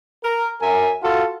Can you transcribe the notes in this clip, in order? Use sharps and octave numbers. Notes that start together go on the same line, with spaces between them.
A#4
F#2 A#4 E5 G#5
F4 F#4 A4